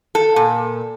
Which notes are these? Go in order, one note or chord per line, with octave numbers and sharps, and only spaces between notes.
A4
A#2